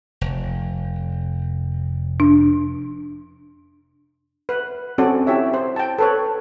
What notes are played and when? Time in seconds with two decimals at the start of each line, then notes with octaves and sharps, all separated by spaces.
0.21 F1
2.20 D4
4.49 B4
4.98 C4 C#4 F#4 A4 D5
5.27 E4 G4 C#5 E5
5.54 C5
5.76 G5 A5
5.99 A4 B4 C#5